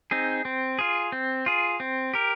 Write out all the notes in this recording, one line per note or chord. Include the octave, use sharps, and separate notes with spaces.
C4 D#4 G#4
C4
F4 G#4
C4
F4 G#4
C4
G4 A#4